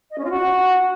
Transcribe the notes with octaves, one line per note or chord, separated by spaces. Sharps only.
D#5
C#4
F4
F#4